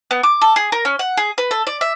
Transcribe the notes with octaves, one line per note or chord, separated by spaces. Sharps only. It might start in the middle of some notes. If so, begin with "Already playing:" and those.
B3
D6
A4
G#4
A#4
C#4
F#5
G#4
B4
A4
D5
E5